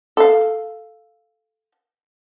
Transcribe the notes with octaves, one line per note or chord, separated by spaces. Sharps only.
A4 F5